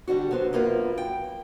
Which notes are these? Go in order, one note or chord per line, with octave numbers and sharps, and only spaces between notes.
D3 G3 D4 F#4
F#3 B3 C5
F#2 A#3 F4 B4
G5